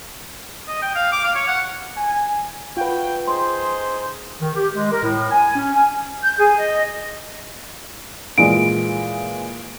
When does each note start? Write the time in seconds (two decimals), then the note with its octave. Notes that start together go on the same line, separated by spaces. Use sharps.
0.68 D#5
0.82 G5
0.95 F5
1.12 D6
1.24 F5
1.35 C#5
1.48 F#5
1.97 G#5
2.77 F4 F#4 B4 G5
3.27 D#4 G#4 C5 C6
4.41 D#3
4.55 G4
4.74 G#3
4.91 A#4
5.03 A2
5.31 G#5
5.55 C#4
5.74 G#5
6.22 G6
6.38 G#4
6.57 D#5
8.38 A#2 E3 G#3 D7